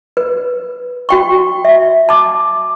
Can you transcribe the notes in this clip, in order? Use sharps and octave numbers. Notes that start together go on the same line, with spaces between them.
B4
F#4 G5 C#6
E5
A5 D6